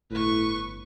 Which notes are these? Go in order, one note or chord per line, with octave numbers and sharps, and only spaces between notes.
G1 A2 B4 C#6